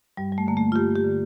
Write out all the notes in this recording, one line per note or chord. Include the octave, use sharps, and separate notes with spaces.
G2 G3
G3
A3
D3 A#3
A3
F4
G2 G4
G4
D3